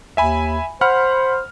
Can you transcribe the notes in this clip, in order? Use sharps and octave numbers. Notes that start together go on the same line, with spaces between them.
D#2 E5 G#5 B5
C5 F#5 B5 F6